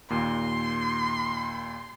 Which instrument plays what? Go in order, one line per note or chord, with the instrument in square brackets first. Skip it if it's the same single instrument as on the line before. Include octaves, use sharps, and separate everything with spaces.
[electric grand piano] D#2 A#2 [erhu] C6